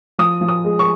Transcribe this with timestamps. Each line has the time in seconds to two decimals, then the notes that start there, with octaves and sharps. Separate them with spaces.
0.19 F3 D#6
0.41 F3
0.49 D#6
0.64 G#3
0.79 C#6